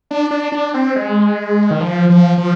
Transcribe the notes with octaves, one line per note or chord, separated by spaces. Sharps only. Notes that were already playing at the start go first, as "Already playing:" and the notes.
D4
D4
D4
C4
G#3
D#3
F3
F3
F3